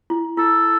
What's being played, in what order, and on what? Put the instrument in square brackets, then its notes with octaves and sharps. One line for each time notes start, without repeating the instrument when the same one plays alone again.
[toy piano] E4
[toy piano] E4 [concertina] A4